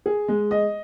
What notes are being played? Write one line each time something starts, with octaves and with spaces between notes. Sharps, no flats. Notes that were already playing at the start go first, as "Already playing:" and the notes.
G#4
G#3
D#5